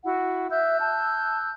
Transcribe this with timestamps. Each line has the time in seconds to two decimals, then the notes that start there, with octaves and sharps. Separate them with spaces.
0.04 E4 F#4 F#5
0.51 E5 E6 F#6 G6
0.80 A5